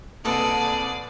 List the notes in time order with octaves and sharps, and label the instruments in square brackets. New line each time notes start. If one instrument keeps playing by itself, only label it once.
[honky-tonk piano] C2 A#2 D7 [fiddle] G#4 D5 [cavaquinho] A4 B4 D#5